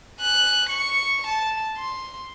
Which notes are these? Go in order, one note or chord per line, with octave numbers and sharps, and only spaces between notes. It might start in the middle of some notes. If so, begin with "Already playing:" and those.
G#5 F#6
C#6 C#7
A5
C6